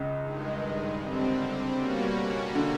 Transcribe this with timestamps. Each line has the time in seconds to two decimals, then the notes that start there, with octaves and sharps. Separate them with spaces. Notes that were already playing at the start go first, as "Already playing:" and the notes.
Already playing: C#2 C#3
0.22 G2 D#3 G#3
1.00 D3 G3 C4
1.77 B2 G3 A#3 C#4 F#4
2.55 D3